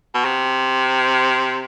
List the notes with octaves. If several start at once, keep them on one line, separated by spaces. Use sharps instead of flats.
B2
C3